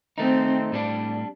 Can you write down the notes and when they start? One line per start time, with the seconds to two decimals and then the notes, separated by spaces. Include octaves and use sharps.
0.18 D#3 A3 C4 D#4
0.72 A2 G3 D4